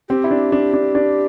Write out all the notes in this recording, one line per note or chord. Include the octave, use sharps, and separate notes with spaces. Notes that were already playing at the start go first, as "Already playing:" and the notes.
C4 G4
E4
D4
D4
D4
D4